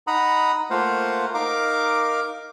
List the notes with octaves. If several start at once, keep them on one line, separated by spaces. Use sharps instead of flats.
D#4 F#5 A#5 B5 D#6
A3 A#3 F4 C5 F5 F#5
D#4 A#4 F5 D6